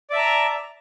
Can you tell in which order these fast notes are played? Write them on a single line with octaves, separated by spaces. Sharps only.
D5 E5 A5 A#5